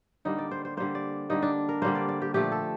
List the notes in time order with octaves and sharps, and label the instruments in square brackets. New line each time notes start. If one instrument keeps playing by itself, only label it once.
[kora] D3 G3 A#3 D#4
D5
C5
C5
D3 G3 A#3 C5
D5
D3 G3 A#3 D#4
D4
A#4
D3 G3 A#3 C5
D5
D5
G4
A#2 F3 A3 G4
A4